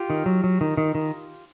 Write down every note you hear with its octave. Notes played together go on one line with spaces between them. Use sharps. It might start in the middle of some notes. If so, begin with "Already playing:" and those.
Already playing: F4 G4
D#3
F#3
F#3
D#3
D#3
D#3